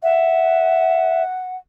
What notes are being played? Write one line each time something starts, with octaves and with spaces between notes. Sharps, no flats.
E5 F#5